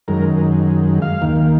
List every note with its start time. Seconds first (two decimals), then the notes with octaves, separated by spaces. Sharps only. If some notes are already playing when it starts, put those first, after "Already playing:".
0.08 F#2 D#3 G#3 A#4
1.02 F5
1.21 D#2 D#3 A#3